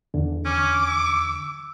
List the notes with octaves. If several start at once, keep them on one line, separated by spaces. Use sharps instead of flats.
E2 D3
C#4 D6
E6